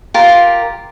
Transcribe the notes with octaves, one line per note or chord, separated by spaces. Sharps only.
F4 G4 A#4